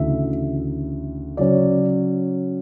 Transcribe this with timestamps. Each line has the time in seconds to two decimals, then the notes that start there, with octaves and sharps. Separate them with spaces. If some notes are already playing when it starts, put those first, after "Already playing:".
Already playing: D2 C#3 E3 E5
1.37 C#3 F#3 C#4 D5